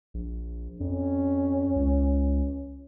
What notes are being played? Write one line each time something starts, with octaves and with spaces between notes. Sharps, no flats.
A#1
F2 C#4
C#2